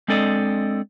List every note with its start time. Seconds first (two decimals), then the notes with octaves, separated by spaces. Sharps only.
0.08 G#3 C4 D4 A4 D5 D#5